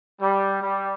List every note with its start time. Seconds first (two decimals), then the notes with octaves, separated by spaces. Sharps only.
0.21 G3
0.62 G3